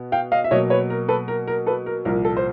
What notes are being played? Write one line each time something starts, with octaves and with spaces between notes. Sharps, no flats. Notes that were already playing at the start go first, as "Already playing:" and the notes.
Already playing: B2 B3
F5 G5
D#5 F5
E5
B2 F#3 A#3 C#5 D#5
B4 C#5
A#4
A4 B4
A#4
A#4
A4 B4
A#4
C2 A#2 F3 A#4
A4
C5